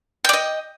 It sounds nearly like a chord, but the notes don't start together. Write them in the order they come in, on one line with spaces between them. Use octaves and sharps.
G5 D5 D#5